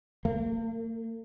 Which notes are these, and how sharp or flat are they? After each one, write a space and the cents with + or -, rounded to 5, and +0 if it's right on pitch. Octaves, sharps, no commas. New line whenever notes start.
A#3 -45